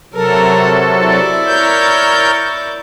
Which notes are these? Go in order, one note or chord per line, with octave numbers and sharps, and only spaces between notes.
C3 F#3 A4 A#4
E4 D5
A#4 C#5 G6